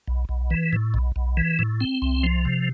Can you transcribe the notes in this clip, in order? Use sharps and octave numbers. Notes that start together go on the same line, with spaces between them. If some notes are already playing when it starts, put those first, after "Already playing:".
B1
B1
E3
A2
B1
B1
E3
A2
C4
C2
F3
C3